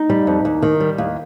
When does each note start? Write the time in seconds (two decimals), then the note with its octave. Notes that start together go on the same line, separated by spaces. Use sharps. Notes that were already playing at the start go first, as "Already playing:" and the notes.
Already playing: D#4
0.10 G3
0.27 F2
0.45 D#2
0.62 D#3
0.80 G3
0.98 D#2